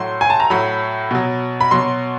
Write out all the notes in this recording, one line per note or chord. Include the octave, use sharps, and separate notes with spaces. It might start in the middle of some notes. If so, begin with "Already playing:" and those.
Already playing: A2 F#3 C6
G#5
A5
A#5
A2 F#3 B5
B2 F#3
B5
B2 F#3 C6